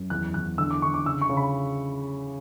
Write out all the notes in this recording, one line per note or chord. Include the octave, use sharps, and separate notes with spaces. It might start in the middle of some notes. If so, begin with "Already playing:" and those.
Already playing: F#2
E2 F#6
E2 F#6
D3 E6
D6
D3 C#6
D6
C#3 E6
C#6
C#3
B5